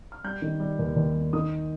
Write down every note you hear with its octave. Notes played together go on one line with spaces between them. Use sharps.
F6
G3 G6
D#3
G3
D#2
D#2
G3
D#3 D#6